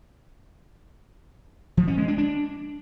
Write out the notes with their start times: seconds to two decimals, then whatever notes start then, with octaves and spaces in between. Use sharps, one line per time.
1.77 F3
1.87 C#4
1.98 G#3
2.08 D4
2.18 D4